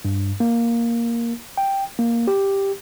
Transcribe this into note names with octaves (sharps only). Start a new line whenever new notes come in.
G2
A#3
G5
A#3
G4